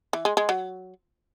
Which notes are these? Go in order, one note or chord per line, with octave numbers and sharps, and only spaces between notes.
E3
G#3
G#3
F#3